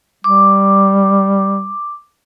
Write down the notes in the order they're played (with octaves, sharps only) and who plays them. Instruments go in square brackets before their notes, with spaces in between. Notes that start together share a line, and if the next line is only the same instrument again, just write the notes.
[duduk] G3 [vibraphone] D6